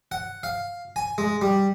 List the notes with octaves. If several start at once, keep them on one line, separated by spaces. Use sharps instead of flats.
F#5
F5
G#5
G#3
G3